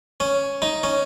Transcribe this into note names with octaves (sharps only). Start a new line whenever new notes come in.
C#4
D#4
C#4